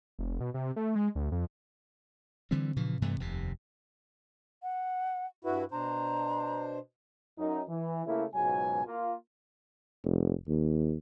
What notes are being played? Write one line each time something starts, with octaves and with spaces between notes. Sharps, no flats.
F1
B2
C3
A3
G#3
D2
F2
D3 E3 G3 C4
A#2 C#3 E3 F3
G2 C3 E3 A3
F1 D#2 C3
F#5
G2 E4 F#4 B4
B2 D4 C5 A#5
F#2 D#4
E3
C#3 A3 A#3 E4
C#2 G#2 B2 F#3 G#5
A#3 F4
F1
D#2